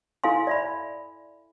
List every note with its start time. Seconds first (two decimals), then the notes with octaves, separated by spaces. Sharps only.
0.24 E4 A4 F5 G#5 C6
0.47 D5 E5 B5